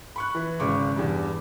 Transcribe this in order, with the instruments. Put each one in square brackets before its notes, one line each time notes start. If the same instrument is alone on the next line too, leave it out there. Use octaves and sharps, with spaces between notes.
[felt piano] B5 C#6 F#6
E3
G#1 C#3 C#6 D6
E2 G2